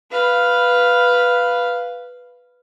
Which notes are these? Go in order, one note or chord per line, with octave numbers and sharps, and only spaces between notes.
B4 F5